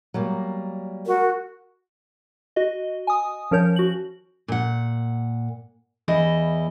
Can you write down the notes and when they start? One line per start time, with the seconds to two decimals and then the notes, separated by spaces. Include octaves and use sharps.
0.14 F#3 G3 A#3
1.07 F#4 A#4
2.56 F#4 D#5
3.07 G#5 D#6
3.51 F3 C#4 A#4 C#5 G6
3.76 F#4 F#7
4.48 A#2 F#5
6.08 E2 E4 D#5